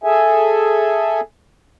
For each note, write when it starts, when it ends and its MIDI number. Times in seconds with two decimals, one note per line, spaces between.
0.04 1.21 68
0.04 1.21 69
0.04 1.21 76
0.04 1.21 80